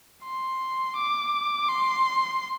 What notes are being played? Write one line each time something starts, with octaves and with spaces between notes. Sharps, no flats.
C6
D6
C6